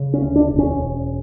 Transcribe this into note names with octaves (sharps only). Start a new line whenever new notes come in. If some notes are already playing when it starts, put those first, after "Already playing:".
Already playing: C#3
C#4
D2
D4
E1
C#4
E1